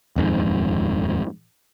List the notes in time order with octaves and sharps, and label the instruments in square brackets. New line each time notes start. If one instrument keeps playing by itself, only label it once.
[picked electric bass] D#1 F2 G#2